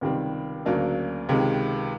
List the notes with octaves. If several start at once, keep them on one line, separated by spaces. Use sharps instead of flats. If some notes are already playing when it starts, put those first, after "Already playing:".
C#2 C3 D#3 G3 C4
D2 C#3 F#3 A#3 D4
C#2 C3 D#3 G#3